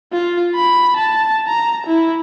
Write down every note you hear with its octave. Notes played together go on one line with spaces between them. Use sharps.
F4
B5
A5
A#5
E4